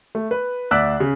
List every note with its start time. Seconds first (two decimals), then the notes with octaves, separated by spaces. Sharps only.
0.15 A3
0.31 B4
0.71 D2 D5 E6 F#6 B6
1.00 C#3